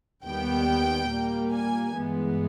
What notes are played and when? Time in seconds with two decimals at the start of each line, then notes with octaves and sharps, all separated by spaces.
0.24 D#2 D#3 G3 B3 G5
1.09 A#2 G3 A#3
1.52 G#5
1.95 G2 E3 G#3 B3